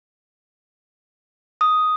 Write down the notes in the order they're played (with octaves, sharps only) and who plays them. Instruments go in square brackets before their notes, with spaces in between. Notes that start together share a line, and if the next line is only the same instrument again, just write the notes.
[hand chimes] D#6